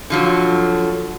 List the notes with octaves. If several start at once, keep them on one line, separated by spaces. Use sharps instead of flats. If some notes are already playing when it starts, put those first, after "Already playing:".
D3 F3 F#3